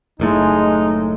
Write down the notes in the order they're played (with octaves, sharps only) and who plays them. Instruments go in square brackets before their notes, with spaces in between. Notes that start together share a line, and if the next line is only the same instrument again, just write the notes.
[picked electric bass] F#1 A2 A3 [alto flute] G#3 [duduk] D#4